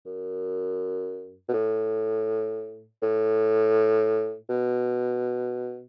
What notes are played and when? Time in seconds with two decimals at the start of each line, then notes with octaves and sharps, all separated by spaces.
0.06 F#2
1.49 B2
1.54 A2
3.02 A2
4.49 B2